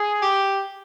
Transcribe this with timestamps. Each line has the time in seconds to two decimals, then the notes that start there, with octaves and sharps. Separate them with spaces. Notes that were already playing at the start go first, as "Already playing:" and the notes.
Already playing: G#4
0.22 G4